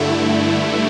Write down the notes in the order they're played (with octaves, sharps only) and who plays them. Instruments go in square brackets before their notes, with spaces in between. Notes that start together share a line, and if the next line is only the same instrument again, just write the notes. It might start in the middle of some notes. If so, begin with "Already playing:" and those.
Already playing: [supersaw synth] G2 D3 A3 E4